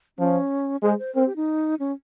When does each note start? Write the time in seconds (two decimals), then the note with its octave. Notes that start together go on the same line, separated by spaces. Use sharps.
0.19 F3 C#4
0.83 G#3 C5
0.99 C5
1.15 C4 A#4
1.26 G4
1.36 D#4
1.80 C#4